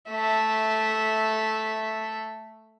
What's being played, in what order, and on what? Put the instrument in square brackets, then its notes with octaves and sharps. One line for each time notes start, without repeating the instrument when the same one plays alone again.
[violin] A3 E5